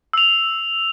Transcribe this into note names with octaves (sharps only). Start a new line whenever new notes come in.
E6 F7